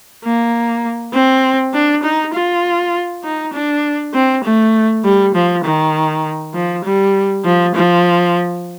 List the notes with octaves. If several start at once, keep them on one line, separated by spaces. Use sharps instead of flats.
A#3
C4
D4
D#4
F4
D#4
D4
C4
A3
G3
F3
D#3
F3
G3
F3
F3